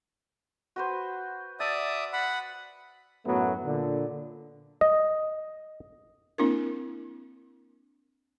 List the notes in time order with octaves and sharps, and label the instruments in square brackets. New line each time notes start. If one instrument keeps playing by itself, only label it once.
[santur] F#4 B4 C5
[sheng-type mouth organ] D5 E5 D#6 [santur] A5
[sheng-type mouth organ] F#5 B5
[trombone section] F#2 A2 F#3 A3 B3
A#2 D3
[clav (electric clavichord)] D#5
[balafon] A#3 C4 D4 E4 A#4